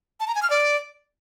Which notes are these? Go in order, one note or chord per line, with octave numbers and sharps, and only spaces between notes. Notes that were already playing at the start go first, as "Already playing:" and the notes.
A5
A#5
G#5
F6
D5